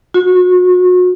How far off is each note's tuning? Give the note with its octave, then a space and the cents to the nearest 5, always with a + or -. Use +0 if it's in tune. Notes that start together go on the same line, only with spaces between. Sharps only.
F#4 -35